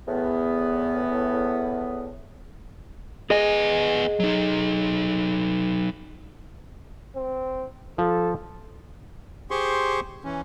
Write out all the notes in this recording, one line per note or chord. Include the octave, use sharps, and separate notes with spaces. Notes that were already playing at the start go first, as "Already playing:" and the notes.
E2 A2 B3
B3 G#4 D#5 G#5
F#3 D#4
C4
F3 A4
G4 G#4 C5 C6 C#6
E3 C#4